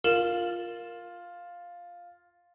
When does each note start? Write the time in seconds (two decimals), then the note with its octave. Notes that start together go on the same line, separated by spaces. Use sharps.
0.04 F4 A#4 E7 F#7